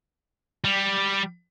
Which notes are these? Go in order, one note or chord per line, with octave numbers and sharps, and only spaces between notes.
G3